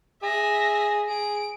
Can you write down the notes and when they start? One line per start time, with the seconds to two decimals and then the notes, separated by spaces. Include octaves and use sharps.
0.23 G#4 E5 A#6
1.10 G#4 D7